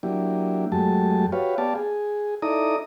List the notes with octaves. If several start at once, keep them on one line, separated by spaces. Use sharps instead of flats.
F#3 A#3 D4 E4 G4
F#2 F#3 G#3 A3 G4 A5
F#4 G4 B4 C#5 F5
B3 G4 D5 F5 A5
G#4
D#4 E4 A4 D5 A#5 D#6